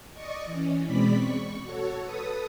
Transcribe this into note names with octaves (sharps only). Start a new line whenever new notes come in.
D5 D#5 C#6
E3 C#4
B2 G#3 C4 D5 B5 B6
C#6
F#4 A4 C#5
A4 B4 D#6